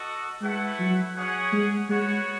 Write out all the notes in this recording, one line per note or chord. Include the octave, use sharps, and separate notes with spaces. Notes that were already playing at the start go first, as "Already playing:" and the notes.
Already playing: F#4 A4 D#5
G#3 A3 E4 B4 F#5
F#3
C#4 G#4 C#5 F#5
G#3
G#3 B3 F#4 C#5 F#5